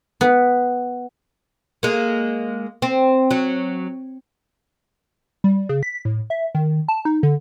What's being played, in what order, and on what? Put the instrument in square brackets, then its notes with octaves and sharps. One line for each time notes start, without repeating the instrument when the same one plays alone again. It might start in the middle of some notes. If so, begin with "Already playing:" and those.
[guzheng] B3
[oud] G#3 A#3
C4
F#3
[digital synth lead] G3
C#3
B6
A2
E5
D#3
A5
D#4
D3